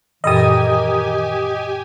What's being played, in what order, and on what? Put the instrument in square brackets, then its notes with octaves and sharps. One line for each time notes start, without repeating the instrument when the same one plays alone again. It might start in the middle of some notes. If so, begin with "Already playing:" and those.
[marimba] F#2 A#2 E3 [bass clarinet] D#3 [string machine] G4 G#5 [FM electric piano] D#5 D#6